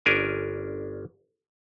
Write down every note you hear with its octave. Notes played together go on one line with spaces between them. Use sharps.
G1 C#4 D4 A#4 G#5